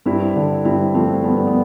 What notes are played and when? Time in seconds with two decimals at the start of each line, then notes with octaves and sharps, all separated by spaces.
0.06 G2 C4 E4
0.36 D3
0.65 G2 C4 E4
0.95 F3 A3 C4
1.24 G2 B3
1.36 C4
1.47 B3